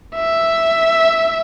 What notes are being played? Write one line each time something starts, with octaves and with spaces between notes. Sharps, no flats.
E5